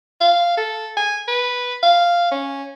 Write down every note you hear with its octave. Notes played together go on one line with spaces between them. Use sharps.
F5
A4
G#5
B4
F5
C#4